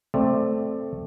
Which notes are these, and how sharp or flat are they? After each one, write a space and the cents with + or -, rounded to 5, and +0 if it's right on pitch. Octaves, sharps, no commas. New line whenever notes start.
A3 +0 C4 +0 D5 +15